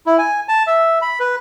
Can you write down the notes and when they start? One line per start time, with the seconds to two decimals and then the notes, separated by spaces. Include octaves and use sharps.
0.06 E4
0.18 G#5
0.48 A5
0.67 E5
1.02 B5
1.20 B4